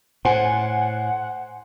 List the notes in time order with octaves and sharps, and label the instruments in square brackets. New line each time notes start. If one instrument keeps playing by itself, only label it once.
[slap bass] A2 [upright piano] C5 G#5 [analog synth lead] F#5